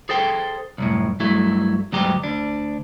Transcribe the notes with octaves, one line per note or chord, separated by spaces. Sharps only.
G#4 A4 C5 G5
C2 F#2 A2
G2 F#3 A3 E4
D2 G2 F#3 G#3 G4
D2 D4